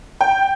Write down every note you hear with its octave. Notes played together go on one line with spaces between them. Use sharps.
G5